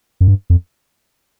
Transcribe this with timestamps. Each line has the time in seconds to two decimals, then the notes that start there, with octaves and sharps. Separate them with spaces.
0.20 F#2
0.28 G2
0.50 F2